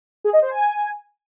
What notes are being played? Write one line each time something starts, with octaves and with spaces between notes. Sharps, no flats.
G#4
D#5
C5
G#5